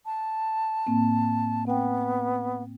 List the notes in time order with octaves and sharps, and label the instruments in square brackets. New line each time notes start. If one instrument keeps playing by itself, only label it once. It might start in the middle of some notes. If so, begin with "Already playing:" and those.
[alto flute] A5
[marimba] A2 A#3 C4
[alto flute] B3 [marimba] C4 G5